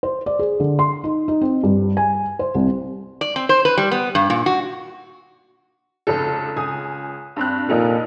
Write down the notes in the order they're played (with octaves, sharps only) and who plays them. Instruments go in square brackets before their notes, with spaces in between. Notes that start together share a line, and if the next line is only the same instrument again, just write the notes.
[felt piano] C5
D5
G#4
D3
C6
D#4
D#4
C4
G2
G#5
C5
C2
[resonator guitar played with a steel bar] D5
C4
C5
B4
G3
B3
G2
A#2
F#4
[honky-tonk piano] F1 C#2 A4
C#2 G#5 D#6
G2 C4 F#6
[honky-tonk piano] F1 D#4 A4 [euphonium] A#2